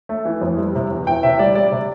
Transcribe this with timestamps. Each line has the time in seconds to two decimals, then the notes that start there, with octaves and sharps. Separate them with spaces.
0.09 A3
0.25 E3
0.42 F2
0.58 G3
0.75 C3
0.91 E2
1.07 E3 G5
1.23 C3 E5
1.39 G3 D5
1.55 G3 D5
1.72 C3